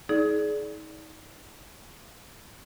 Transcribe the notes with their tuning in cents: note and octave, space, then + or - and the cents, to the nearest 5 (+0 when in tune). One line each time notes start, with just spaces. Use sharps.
D#4 +35 G#4 +30 D5 -10